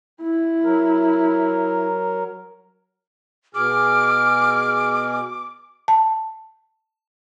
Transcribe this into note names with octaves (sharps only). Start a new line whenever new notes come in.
E4
F#3 A#4
B2 G#4 D6 F6
A5